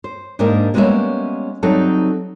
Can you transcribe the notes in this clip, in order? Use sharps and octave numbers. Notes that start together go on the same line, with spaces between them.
C5
G#2 A#3 D4 G4 A#4 D#5
G3 G#3 A#3 B3 C#4 E5
F#3 G3 C4 D#4 A4